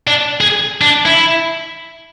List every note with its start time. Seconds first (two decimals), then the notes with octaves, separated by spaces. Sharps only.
0.07 D4
0.41 G#4
0.81 D4
1.06 E4